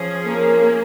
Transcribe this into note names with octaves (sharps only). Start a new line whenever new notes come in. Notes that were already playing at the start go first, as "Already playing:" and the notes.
Already playing: F3 C#4 G#4
A#3